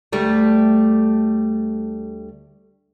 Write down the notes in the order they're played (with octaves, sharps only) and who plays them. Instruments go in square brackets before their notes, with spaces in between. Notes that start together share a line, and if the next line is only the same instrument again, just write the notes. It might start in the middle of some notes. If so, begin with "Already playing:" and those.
[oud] D2 G3 A3